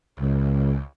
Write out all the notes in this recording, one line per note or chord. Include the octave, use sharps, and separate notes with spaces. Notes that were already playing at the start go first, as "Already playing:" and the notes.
C#2